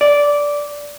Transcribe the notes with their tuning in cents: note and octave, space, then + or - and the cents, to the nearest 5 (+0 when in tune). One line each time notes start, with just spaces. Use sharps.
D5 -10